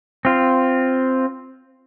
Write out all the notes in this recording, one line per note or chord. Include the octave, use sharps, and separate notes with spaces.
C4 F4